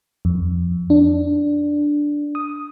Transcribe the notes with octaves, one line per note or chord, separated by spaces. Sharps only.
F2
D4
D#6